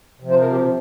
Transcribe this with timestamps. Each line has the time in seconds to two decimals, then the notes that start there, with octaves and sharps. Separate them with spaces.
0.20 C3 F3
0.30 C5
0.41 A#4
0.51 G4